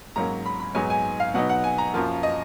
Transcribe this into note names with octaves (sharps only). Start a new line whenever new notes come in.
G#2 F#3 A#3 C#4 A#5
B5
B5
G#2 F#3 B3 D#4 G#5
G#5
F5
B2 F#3 B3 D#4 F#5
F#5
G#5
A#5
F#2 F3 A#3 F4
D#5